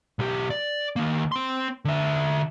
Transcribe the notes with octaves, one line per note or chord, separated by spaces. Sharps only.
B1 G4
D5
D#3 A#3
C4 C6
D3 E5